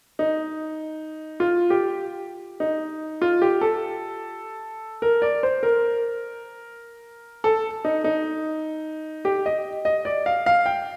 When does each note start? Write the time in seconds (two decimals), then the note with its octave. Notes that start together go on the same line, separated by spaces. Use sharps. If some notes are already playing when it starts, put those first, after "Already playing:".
0.19 D#4
1.40 F4
1.70 G4
2.60 D#4
3.22 F4
3.42 G4
3.61 A4
5.02 A#4
5.22 D5
5.43 C5
5.63 A#4
7.44 A4
7.85 D#4
8.04 D#4
9.25 G4
9.46 D#5
9.85 D#5
10.05 D5
10.26 F5
10.46 F5
10.66 G5